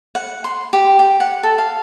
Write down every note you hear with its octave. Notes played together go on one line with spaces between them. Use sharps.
F#5
C6
G4
G5
F#5
A4
F5